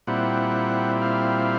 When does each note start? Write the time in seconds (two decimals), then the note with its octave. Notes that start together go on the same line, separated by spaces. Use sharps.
0.07 A#2 G3 C4 E4 F#5
1.01 F5